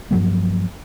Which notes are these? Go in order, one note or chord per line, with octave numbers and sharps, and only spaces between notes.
G2 F3 F#3 A#3